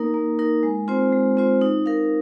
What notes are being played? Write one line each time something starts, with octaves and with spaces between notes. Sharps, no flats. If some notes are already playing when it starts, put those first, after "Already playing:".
Already playing: A#3 D#4 A#4
A#3
D#4 A#4
G#3
C4 F4 C5
G#3
C4 F4 C5
D#4
A#4 F5